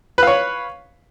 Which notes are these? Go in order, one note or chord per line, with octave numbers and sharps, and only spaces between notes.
B4 C#5 F5